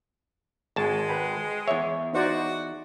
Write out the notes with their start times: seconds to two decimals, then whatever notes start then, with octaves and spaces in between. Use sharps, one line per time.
0.76 G#1 G#3 G#5 A5
1.09 B4 G5 B5
1.68 E2 C#5 E5
2.13 D#4 F#4 C5 D5